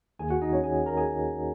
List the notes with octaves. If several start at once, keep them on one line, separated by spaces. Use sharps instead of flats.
D#2 D#3 A#3 G#4 G#5
F#4 F#5
D#4 D#5
C#4 C#5
G#4 G#5
A#4 A#5
G#4 G#5